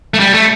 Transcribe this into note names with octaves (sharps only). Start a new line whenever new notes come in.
A3
G3
A3